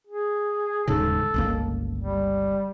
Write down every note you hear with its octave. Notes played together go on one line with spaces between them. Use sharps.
G#4
D#1 G#2 C#3 A4
G1 C#2 A#3
G3